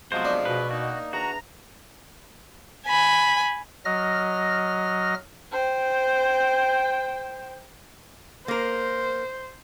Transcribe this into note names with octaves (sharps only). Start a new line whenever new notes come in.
C3 F3 F#3 G#3 B3 F#4 C5
D4
B2 B4
A#3 D#4 F#4
E2 D4 F#4 A#5
G#5 B5
F#3 D#5 F6 A#6
C5 G5
A#3 A#4 C5